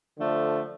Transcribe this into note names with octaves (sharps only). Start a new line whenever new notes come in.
D3 F3 A3